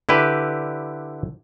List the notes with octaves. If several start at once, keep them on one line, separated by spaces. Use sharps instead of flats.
D3 E4 G4 B4